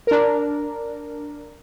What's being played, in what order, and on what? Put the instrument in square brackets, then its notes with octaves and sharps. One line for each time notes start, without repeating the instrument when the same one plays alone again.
[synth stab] D4 A#4